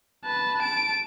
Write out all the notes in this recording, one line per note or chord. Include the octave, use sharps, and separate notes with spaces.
B4 A5
A5 D7